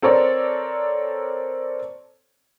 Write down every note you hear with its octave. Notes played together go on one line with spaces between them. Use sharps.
C4 A4 A#4 C#5 D5